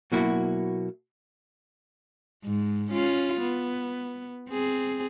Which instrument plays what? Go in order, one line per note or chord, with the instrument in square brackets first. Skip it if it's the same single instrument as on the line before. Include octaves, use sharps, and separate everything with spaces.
[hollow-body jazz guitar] B2 F#3 A#3 E4 F#4
[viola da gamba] G#2 G#3
C#4 F4
B3
C4 G#4